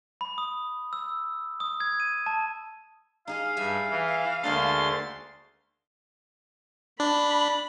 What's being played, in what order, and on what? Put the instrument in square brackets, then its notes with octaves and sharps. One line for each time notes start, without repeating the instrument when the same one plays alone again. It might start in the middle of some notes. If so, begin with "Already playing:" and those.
[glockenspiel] B5
D#6
E6
D#6
G#6
D#7
A5
[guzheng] D#4 G#4 D#5 [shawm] F5
[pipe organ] G2 [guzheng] E5 G#5
[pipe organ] E3
[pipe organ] D2 C6 A6 [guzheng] G#3 A#3 D4
[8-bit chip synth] D4 [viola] B5